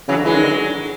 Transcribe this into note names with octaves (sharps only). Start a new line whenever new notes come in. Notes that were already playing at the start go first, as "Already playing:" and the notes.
C#3 E3 F#3
D3
E3 F#3 G#3
D#3
D3